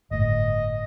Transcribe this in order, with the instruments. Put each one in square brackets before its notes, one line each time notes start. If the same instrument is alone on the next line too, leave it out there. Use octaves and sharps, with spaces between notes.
[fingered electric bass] G1 A2 [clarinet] D#5